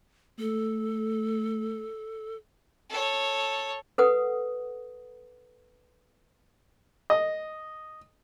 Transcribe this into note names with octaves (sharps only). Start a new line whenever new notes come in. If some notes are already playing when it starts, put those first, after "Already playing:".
A3 A4
A4 C#5
A4 B4 F#5 D#6
D#5